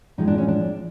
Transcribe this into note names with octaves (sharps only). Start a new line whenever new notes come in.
A2 F3 G#3 D#4
D4
C#4
D4